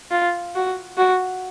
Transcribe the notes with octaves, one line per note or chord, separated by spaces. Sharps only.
F4
F#4
F#4